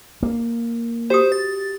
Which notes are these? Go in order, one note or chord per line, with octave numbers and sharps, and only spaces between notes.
A#3
F#4 G4 C5 D#6
A6